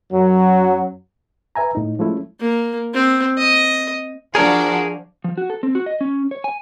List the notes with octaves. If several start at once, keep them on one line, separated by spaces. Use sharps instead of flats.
F#2 F#3
B4 E5 G#5 A#5
A2 D#4
F3 G#3 A3 C#4 E4
A#3
C4
D#5
F3 D4 F#4 G#4 A#4
F3
F#4
A4
C4
F#4
D#5
C#4
C#5
G#5